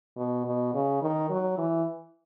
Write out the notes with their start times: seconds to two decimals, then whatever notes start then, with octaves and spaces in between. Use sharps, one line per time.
0.17 B2
0.46 B2
0.74 C#3
1.02 D#3
1.30 F#3
1.58 E3